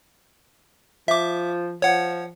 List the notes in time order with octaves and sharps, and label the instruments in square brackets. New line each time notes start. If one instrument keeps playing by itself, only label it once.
[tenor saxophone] F3 [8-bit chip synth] E5 D6
[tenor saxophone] F3 [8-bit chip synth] C#5 F#5